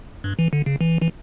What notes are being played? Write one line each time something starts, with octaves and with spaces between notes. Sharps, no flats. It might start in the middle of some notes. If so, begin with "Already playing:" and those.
G2
E3
D3
C#3
E3
E3